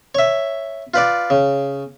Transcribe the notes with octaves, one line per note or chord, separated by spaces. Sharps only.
C#5 E5
F4 B4 D5
C#3